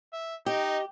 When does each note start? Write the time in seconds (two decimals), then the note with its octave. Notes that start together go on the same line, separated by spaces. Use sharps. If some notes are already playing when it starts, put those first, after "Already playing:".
0.13 E5
0.46 D#4 G4 D#5